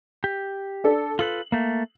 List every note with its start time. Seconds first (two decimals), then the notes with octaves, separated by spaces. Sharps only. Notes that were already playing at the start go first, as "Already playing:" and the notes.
0.24 G4
0.84 D4 A4
1.19 F4 A4 B4 F#7
1.52 A3 A#3